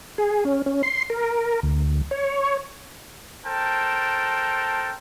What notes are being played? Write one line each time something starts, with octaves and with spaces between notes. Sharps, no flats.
G#4
C#4
C#4
C6
A#4
D2
C#5
A4 A#4 C5 G5 A5